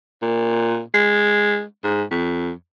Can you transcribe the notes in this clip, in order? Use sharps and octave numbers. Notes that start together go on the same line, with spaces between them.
A#2
G#3
G#2
F2